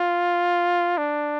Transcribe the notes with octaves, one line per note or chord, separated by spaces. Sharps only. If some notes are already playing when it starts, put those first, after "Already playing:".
Already playing: F4
D4